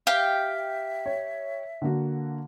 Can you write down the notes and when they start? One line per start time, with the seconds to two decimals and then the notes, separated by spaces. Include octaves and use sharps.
0.07 G4 E5 F5 G5
1.06 C#5
1.82 D3 A#3 F#4